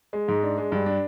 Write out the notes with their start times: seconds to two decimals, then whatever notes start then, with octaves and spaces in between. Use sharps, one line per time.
0.13 G#3
0.28 G#2
0.43 D4
0.58 G#3
0.72 G2
0.86 D4